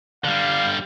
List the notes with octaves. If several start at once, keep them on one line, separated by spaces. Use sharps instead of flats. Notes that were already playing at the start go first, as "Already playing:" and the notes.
D3 G3 F5